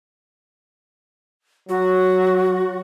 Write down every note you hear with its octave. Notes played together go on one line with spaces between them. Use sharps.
F#3 F#4